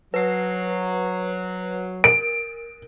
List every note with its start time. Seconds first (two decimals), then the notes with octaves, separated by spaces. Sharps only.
0.14 F#3 B4 C7
2.04 A#4 D7